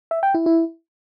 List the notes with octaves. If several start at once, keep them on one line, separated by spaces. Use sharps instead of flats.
E5
G5
E4
E4